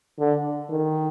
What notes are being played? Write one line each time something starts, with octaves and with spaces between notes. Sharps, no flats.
D3
D#3